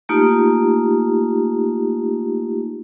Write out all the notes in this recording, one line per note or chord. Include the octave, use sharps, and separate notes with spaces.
A3 A#3 D#4 F4 G4